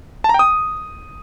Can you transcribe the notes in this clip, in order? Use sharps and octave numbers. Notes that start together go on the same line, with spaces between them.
A5
A#5
G5
D#6